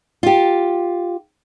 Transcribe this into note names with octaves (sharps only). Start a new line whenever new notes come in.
F4 G4